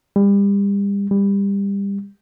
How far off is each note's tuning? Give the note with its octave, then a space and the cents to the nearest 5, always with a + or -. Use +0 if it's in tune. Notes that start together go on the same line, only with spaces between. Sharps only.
G3 +35
G3 +25